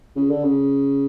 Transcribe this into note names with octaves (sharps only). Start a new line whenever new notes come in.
C#3
D3
C#3